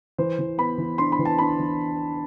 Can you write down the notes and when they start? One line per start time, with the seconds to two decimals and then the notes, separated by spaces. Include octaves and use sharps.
0.18 E3 C5
0.39 E3
0.58 B3 B5
0.78 E3
0.98 D4 C6
1.12 B5
1.19 E3
1.25 A5
1.38 D4 B5
1.59 E3